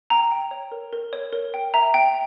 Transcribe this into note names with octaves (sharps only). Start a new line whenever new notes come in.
G5 A#5
G5
C#5
A#4
A#4
C#5
A#4
G5
E5 A#5
G5